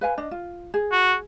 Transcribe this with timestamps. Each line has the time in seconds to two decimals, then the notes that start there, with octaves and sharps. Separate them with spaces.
0.01 B4 F5 G#5
0.17 D4 D#5
0.31 F4
0.74 G#4
0.92 F#4